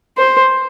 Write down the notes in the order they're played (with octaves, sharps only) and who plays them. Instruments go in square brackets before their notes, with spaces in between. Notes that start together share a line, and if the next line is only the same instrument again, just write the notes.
[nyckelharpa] C5